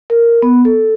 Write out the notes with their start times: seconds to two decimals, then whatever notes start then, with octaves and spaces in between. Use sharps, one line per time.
0.10 A#4
0.42 B3
0.65 A4